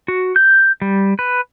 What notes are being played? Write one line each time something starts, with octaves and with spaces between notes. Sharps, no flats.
F#4
G6
G3
B4